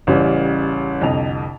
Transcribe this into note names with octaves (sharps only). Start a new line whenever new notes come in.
A1 C#3 E3 G3
C2 F2 D3 D#5 F7